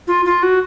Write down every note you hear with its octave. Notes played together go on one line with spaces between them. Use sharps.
F4
F4
F#4